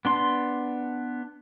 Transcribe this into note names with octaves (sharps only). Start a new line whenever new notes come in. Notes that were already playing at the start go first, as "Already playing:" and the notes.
B3 D4 C6